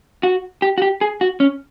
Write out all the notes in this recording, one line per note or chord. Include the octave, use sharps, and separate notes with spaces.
F#4
G4
F#4
G4
G#4
F#4
C#4